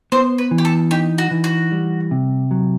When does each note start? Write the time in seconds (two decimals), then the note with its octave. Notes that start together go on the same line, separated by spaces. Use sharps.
0.12 B3 C5
0.38 B4
0.51 E3
0.58 G4
0.65 A4
0.91 D#4 G4
1.18 F#4
1.31 E3
1.44 F#4
1.72 G3
2.11 C3
2.51 F#3